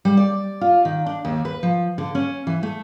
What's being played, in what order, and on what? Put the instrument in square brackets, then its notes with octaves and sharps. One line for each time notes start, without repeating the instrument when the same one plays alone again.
[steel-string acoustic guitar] G3
D5
F4
D#3
D4
D#2
B4
F3
D3
C#4
E3
A3